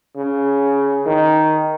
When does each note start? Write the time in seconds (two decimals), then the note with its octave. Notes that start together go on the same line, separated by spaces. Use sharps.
0.16 C#3
1.06 D#3